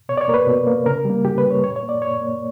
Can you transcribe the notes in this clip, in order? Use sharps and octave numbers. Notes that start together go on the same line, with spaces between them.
B2 C#5
D5
C#5
A#3 A#4
B4
B2
A#3
C#3 A#4
G3 A#3
C#3 G4
B4
G3 A#3
C#5
A#2 C#5
C#5
A#3
D5
A#2 C#5
A#3